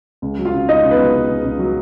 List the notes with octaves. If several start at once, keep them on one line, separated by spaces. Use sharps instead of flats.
C#2
F#3
F4 F5
C#3
C#2 D#4 D#5
C#2
B3 B4
F#3
C#3
C#2
C#2
F#3